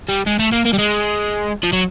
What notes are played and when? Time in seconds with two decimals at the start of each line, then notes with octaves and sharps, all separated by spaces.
0.09 G3
0.26 G#3
0.39 A3
0.52 A#3
0.65 A#3
0.73 G3
0.79 G#3
1.63 F3
1.73 F#3